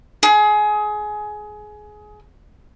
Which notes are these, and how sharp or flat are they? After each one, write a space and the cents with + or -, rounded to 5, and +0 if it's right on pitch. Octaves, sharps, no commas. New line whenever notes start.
G#4 +20